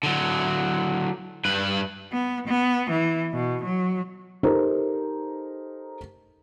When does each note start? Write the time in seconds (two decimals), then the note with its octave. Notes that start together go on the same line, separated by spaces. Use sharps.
0.03 D3 F#3
1.45 G2 B4
2.13 B3
2.48 B3
2.90 E3
3.33 B2
3.64 F#3
4.43 D#4 G4 A4 A#4 C5